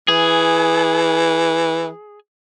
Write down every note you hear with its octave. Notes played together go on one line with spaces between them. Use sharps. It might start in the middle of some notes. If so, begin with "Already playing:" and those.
E3 G#4